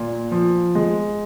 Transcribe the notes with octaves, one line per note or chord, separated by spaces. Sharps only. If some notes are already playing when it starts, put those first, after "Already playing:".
Already playing: A#2
F3
G#3